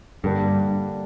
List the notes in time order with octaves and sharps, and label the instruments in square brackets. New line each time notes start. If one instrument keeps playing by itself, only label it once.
[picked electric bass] G2 [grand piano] D3 G3 A#3 D4